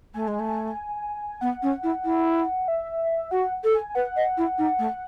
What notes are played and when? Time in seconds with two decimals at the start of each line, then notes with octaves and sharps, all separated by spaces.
0.14 A3 G#5
0.27 G#3
0.39 A3
1.41 B3 F#5
1.62 C#4
1.83 E4
2.05 E4
2.68 E5
3.31 F#4 F#5
3.64 A4
3.74 G#5
3.90 G#5
3.95 B4 F#5
4.16 D#5
4.37 E4
4.58 D#4
4.79 A3